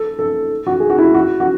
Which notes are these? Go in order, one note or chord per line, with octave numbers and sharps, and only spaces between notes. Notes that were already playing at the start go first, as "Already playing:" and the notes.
Already playing: A4
A4
F#4
G#4
F#4
E4
F#4
F#4